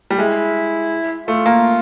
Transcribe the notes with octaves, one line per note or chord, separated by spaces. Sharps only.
G3
G#3 E4
A3 F4
A#3